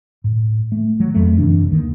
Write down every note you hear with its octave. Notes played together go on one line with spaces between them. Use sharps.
A2
A3
F#3
F2 G3 A3
F#2 C3 E3 D4
D#2 D#3